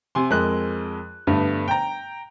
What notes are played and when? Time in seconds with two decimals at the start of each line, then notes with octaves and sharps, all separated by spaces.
0.15 C3 G#5 C6
0.30 F2 G#3 A#4 F#6
1.27 G2 D3 A3 B3
1.68 G5 A#5